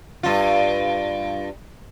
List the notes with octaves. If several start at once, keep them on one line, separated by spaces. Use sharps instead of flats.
G2 F4